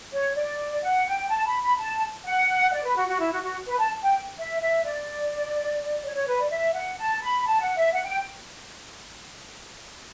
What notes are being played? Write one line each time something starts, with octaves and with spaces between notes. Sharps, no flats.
C#5
D5
F#5
G5
A5
B5
B5
A5
F#5
D5
B4
F#4
F#4
E4
F#4
F#4
B4
A5
G5
E5
E5
D5
C#5
C#5
B4
D5
E5
F#5
A5
B5
A5
F#5
E5
F#5
G5